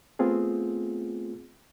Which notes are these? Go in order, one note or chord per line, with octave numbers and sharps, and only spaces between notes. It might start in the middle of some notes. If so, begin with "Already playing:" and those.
A3 B3 C4 F4 G#4